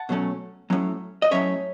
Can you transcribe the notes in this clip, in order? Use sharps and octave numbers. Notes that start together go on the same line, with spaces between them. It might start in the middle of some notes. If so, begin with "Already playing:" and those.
Already playing: F#5 A5
B2 F#3 A3 C#4
A2 F#3 C#4
D#5
A2 F#3 C#4 C#5 E5